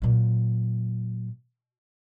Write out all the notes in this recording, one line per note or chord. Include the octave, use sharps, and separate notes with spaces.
A#2 F#3